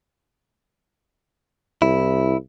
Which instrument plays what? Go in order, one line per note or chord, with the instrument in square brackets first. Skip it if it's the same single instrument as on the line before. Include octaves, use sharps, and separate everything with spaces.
[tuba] C2 [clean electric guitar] E4